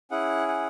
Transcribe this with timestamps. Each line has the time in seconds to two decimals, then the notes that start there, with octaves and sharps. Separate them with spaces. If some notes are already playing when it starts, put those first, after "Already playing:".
0.11 C#4 E4 G#4 F#5
0.48 F#5